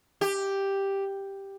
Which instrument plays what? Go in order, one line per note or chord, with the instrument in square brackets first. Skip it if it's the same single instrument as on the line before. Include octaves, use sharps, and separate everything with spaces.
[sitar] G4